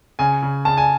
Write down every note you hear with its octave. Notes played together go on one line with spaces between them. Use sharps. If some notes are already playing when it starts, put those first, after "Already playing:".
C#3 G#5
C#3
C#3 A5
G#5